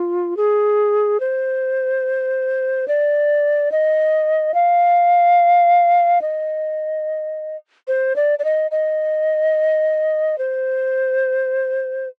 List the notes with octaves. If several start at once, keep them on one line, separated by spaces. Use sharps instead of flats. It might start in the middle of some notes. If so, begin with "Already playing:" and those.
Already playing: F4
G#4
C5
D5
D#5
F5
D#5
C5
D5
D5
D#5
D#5
C5